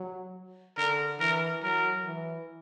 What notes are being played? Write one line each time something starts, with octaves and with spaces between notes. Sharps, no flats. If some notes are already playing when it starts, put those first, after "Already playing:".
Already playing: F#3
D3 A#4
E3 A#4
F#3 A#4
E3